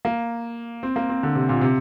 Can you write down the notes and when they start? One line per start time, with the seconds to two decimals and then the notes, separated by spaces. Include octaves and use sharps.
0.05 A#3
0.83 C4
0.96 A#3
1.09 C4
1.23 D3
1.35 C3
1.49 A#2
1.61 C3